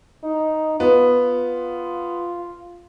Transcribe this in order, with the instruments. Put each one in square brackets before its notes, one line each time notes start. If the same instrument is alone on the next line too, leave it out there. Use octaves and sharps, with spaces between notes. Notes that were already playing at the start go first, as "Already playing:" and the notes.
[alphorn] D#4
[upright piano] B3 [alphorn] F4